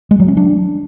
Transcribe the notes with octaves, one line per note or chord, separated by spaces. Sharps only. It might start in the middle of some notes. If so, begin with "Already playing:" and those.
G#3
F#3
C#4
D4